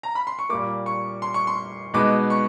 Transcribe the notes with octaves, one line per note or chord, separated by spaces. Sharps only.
A#5
B5
C6
C#6
A#2 G3 A#3 D6
C#6
C6
C#6
C6
B2 G#3 B3 D#4 D6
C#6